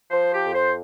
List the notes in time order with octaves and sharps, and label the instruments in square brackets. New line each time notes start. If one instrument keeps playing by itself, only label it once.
[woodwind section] F3 C5
G4
F2
C5